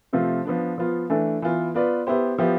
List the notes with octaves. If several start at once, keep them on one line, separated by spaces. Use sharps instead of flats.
C3 F3 A3 C4 F4
F3 B3 D4
F3 B3 F4
E3 A3 D4 A4
E3 B3 F4
B3 F4 B4 D5
B3 E4 G4 C5
F3 B3 E4 G4